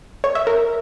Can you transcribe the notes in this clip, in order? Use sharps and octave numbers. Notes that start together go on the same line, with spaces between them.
C#5
E5
A#4